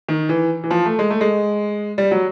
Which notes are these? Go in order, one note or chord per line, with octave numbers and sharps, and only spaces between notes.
D#3
E3
E3
F3
A3
G#3
A3
G#3
G3
F#3